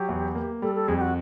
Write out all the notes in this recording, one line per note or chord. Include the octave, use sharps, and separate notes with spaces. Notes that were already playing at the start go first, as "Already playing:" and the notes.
Already playing: F#3 G4
E2
A#3
G3 A4
A4
F2 G#4
G4
F#4